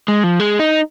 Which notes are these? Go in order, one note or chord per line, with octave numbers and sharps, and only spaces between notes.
G#3
F3
G#3
D#4